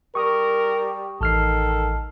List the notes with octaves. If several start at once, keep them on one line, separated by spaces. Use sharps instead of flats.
G3 A#4 C#6 D#6
A1 D#3 A4 F6 C7